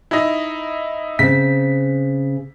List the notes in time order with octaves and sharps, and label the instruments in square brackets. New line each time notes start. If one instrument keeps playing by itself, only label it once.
[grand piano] D#4 E4
[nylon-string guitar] C#3 C4 [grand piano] B6